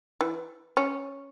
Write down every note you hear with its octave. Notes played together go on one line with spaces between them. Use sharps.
E3
C#4